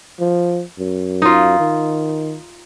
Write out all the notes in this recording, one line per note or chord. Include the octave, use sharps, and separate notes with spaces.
F3
F#2
D#4 F4
D#3